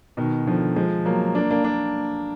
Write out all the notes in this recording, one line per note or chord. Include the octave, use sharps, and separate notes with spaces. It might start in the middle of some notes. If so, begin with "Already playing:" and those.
B2 D#3
D3 F3
F3 G#3
F#3 A#3
A#3 D4
A#3 D4
A#3 D4